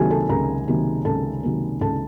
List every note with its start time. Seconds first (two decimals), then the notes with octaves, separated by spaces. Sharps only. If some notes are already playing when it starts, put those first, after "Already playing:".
Already playing: C#2 C3 D#3 F#3 A#3 G#4 G#5 A5
0.10 A4 A5
0.29 C#2 A#4 A#5
0.68 C3 D#3 F#3 A#3
1.05 C#2 A4 A5
1.43 C3 D#3 F#3 A#3
1.81 C#2 A4 A5